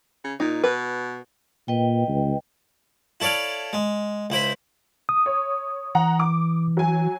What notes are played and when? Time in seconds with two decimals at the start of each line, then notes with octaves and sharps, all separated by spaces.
0.24 C#3
0.40 A#2 D#4
0.63 B2 B4
1.68 A#2 B4 D#5 G5
2.08 C#2
3.20 E4 A4 C#5 D5 F5
3.73 G#3
4.30 C#2 E4 C5 B5
5.09 D#6
5.26 C#5
5.95 E3 F#5 A#5
6.19 D6
6.77 F#3 G#5